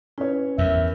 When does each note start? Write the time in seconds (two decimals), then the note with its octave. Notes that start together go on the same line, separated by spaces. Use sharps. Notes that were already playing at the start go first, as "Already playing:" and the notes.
0.18 C#4 E4 B4 C#5
0.58 E2 A#4 E5